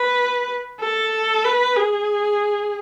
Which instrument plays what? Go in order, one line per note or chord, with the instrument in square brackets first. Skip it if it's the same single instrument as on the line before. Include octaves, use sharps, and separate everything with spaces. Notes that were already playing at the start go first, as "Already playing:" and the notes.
Already playing: [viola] B4
A4
B4
G#4